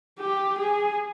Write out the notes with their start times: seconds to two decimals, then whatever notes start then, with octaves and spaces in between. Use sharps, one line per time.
0.19 G4
0.58 G#4